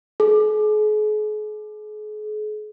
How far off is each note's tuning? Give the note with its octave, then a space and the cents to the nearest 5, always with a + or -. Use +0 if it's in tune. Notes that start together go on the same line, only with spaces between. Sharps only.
G#4 +40